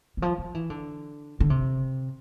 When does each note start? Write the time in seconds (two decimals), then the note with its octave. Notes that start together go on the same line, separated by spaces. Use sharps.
0.17 E3
0.22 F3
0.38 F3
0.55 E3
0.70 D3
1.40 D3
1.50 C3